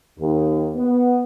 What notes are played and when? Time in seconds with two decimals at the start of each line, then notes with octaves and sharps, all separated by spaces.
0.19 D#2
0.76 B3